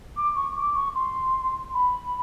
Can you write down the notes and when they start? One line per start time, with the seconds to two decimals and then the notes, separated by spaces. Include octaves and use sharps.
0.16 D6
0.35 C#6
0.55 D6
0.74 C#6
0.95 C6
1.74 B5